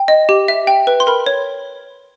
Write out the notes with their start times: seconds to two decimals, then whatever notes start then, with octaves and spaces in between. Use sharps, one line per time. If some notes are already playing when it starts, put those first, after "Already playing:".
Already playing: G5
0.08 D#5
0.29 G4
0.48 E5
0.67 G5
0.87 B4
1.00 C6
1.07 A#4 B5
1.26 C#5